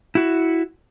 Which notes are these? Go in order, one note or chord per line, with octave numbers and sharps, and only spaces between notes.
E4 F#4